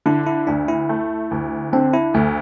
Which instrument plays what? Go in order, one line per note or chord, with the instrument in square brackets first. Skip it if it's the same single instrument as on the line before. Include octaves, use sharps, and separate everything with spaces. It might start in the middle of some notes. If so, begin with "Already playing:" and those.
[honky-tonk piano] D3 [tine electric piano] E4
[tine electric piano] E4
[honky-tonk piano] D2 [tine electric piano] D4
[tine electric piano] E4
[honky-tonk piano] A3
D2
[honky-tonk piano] D3 [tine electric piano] C4
[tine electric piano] E4
[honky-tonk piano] D2 [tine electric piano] A3